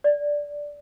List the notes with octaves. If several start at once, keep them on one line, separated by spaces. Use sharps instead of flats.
D5